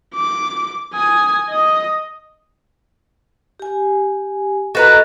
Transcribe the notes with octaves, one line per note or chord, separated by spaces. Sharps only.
D6
G#5 D#6
D#5 D#6
G4 G#5
F#4 A4 B4 D#5 A#5